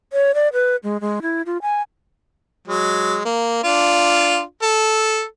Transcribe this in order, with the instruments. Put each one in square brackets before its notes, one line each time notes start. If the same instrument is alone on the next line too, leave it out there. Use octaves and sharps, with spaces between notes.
[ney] C#5
D5
B4
G#3
G#3
E4
F4
G#5
[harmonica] F#3 G#3
A#3
D4 F4
A4